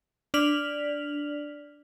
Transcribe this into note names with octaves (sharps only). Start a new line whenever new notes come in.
D4 D5 F6 B6 F7 F#7